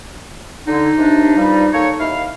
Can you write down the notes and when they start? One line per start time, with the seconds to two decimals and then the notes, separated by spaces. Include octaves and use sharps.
0.68 D3 D#4
0.97 D#2 C3 D4
1.37 G2 F3 G3
1.73 A#3 A4 C#5
1.99 D#2 E4 F5